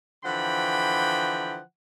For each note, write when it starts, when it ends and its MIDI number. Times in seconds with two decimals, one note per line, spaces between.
0.24 1.59 50
0.24 1.59 52
0.24 1.59 53
0.24 1.59 78
0.24 1.59 79
0.24 1.59 83